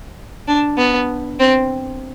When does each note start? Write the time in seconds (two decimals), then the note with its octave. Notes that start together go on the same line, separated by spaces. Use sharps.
0.48 D4
0.78 B3
1.40 C4